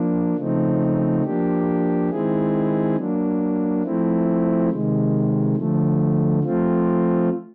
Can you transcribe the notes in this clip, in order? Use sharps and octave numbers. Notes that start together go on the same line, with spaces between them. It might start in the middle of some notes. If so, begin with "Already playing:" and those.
Already playing: F3 A#3 D4
C#3 F3 A3 C4 D#4
F3 A#3 D4 G4
D#3 G#3 C4 E4 G#4
F#3 A#3 D4
F3 A3 C4 E4
C3 D#3 G#3
D3 F3 A3
F3 A3 C4 F4